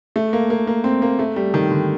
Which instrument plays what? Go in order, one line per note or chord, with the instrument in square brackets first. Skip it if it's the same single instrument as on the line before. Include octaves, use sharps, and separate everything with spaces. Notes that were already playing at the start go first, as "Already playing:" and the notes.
[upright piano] A3
A#3
A#3
A#3
C4
A#3
A3
G3
D#3
D3